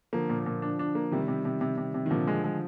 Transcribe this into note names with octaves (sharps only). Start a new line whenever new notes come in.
D3 F3 A#3
A#2
A#2
D4
D4
A#3
C3 D#3 G3
C3
C3
C3
C3
C3
D#3
A#2 D3 F3
G#3
G#3